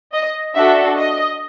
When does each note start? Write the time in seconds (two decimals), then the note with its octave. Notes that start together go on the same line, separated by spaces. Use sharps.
0.13 D#5
0.55 D4 F#4 A4 E5
0.97 D#5